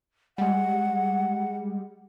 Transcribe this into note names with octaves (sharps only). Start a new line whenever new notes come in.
G3 G#3 F#5